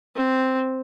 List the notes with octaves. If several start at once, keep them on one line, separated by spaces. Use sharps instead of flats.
C4